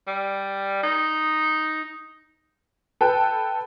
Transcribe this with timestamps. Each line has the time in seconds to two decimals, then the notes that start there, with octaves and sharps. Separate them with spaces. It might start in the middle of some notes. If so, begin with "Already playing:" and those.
0.07 G3
0.83 D#4
3.01 A4 B4 G5